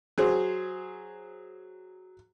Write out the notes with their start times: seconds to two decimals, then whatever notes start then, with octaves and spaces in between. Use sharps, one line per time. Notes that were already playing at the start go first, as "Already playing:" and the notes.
0.18 F#3 G#4 C5